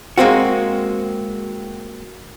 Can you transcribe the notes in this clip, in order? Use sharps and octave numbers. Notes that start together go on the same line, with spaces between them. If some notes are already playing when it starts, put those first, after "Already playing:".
G#3 A#3 C4 F#4